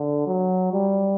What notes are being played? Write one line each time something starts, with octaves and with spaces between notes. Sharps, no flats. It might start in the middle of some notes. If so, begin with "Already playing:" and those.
Already playing: D3
F#3
G3